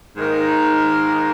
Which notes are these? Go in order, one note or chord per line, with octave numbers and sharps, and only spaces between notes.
G#2 D#3 A#3 D#4 A#4